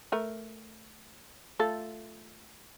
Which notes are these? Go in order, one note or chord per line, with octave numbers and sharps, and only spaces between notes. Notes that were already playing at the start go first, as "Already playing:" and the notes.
A3 A#4
A3 F4 A4